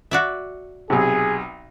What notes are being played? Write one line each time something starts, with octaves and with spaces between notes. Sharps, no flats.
F#4 D5 E5
B1 C3 G#4